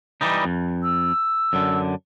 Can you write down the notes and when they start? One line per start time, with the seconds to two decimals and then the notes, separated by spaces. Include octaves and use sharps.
0.21 E3 G3 D#4
0.44 F2
0.83 E6
1.53 F#2 D3